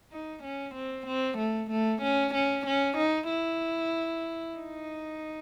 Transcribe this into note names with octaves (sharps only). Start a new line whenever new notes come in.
D#4
C#4
C4
C4
A3
A3
C#4
C#4
C#4
D#4
E4
D#4